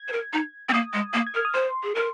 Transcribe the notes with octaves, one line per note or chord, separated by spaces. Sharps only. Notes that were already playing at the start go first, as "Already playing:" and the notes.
Already playing: G#6
C5
A#4
D#4
C4
A#3 D#6
G#3
A#3
G#6
A#4 F6
D#6
C5 C6
G#4
A#4